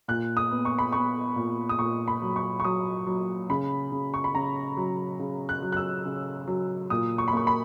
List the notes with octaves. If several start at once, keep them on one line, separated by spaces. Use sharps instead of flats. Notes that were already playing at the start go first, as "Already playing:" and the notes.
A#2 F#6
D#6
B3
C#6
B5
B3 C#6
A#2
D#6
A#2 C#6
B5
F#3
C#6
C#6
F#3 D#6
F#3
C#3 B5
C#3
C#6
B5
C#3 A#5
F#3
C#3
F#6
F#3
F#6
E6
C#3
F#3
A#2 D#6
C#6
B5
A#3 C#6
B5